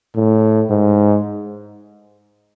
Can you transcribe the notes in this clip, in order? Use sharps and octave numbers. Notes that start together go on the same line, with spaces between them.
A2
G#2